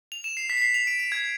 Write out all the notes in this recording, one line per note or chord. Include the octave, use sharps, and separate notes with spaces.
F7
E7
C7
B6
C7
B6
F7
D7
D7
G#6